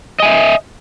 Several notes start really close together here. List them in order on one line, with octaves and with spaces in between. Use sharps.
D#5 G#5 E5